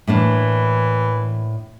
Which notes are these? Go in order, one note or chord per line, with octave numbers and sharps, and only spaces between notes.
A2 E3 A#3 D4